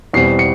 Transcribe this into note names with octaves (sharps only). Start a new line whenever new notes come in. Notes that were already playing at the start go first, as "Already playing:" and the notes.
E2 B2 G3 C4 C7
C#7